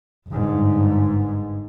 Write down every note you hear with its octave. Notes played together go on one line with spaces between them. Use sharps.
G1 G#2